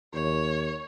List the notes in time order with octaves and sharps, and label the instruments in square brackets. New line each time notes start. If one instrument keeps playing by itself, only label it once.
[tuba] D#2 [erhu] C#5